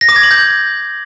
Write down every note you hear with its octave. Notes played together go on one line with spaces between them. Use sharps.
A#6
D6
G#6
F#7
G6